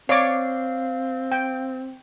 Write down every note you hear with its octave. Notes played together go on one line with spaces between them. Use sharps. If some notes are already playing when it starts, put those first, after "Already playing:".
C4 C#5 D5 F5 D6
G5